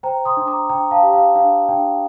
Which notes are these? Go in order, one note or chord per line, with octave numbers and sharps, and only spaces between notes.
C5 G5 A#5
C6 D#6
D4
A#5 D6
D4 G5 A#5
F5 A5
G4
F5
D4 F5
D4 G5